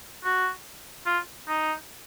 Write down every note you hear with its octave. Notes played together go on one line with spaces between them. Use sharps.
F#4
F4
D#4